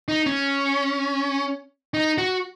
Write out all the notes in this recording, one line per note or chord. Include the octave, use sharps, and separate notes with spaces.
D#4
C#4
D#4
F#4